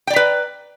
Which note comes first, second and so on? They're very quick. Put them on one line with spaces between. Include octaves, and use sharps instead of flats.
G5 D5 A#5 B4